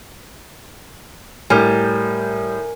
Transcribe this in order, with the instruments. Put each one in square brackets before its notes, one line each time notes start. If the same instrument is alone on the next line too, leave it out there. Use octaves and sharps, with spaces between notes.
[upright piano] A2 [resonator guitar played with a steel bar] G3 [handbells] A#4 G#5